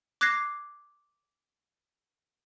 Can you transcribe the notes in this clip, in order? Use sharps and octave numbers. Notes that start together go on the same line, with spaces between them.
D6 F#6 G#6 A#6 C7